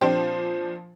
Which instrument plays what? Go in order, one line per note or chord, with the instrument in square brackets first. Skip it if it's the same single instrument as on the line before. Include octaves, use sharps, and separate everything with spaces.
[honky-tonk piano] A#2 F3 D4 [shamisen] C4 G4 G5 [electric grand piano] C5